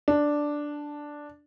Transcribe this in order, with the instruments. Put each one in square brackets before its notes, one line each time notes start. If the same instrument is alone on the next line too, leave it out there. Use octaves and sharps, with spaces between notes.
[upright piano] D4